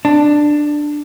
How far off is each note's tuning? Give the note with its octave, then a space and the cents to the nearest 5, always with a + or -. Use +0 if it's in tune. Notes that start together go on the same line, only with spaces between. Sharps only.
D4 +10